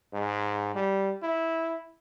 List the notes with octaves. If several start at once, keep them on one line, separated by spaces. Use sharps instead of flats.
G#2
G3
E4